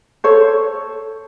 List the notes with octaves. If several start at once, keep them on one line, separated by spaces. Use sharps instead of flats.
A4 C5 C#5